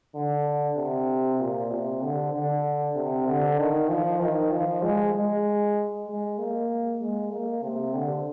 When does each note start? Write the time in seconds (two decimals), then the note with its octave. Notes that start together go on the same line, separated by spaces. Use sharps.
0.15 D3
0.77 C3
1.39 A#2
1.70 C3
2.02 D3
2.33 D3
2.95 C3
3.27 D3
3.58 D#3
3.89 F3
4.20 D#3
4.51 F3
4.83 G#3
5.14 G#3
6.07 G#3
6.38 A#3
7.01 G#3
7.32 A#3
7.63 C3
7.94 D3